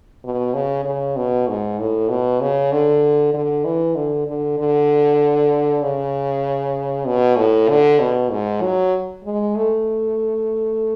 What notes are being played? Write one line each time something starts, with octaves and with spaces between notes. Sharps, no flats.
B2
C#3
C#3
B2
G#2
A2
B2
C#3
D3
D3
E3
D3
D3
D3
C#3
B2
A2
D3
B2
G#2
F#3
G#3
A3